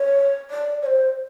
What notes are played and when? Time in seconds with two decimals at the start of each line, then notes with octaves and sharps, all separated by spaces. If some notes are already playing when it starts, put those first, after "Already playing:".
Already playing: C#5
0.51 D5
0.82 C#5
0.86 C5